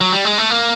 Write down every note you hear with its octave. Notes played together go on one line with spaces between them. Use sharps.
F#3
G3
G#3
A3
A#3